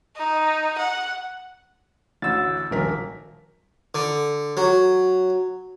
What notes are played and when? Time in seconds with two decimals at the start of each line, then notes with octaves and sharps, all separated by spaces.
0.17 D#4
0.79 F#5
2.22 A1 D2 E6 A6
2.71 D#1 A#1 A#4 B6
3.95 D3
4.57 F#3